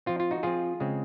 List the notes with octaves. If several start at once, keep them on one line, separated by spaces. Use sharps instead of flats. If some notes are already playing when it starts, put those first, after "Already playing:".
F3 C4 F4
F4
D#4 F#4
F3 C4 F4 G#4
C#3 G#3 C4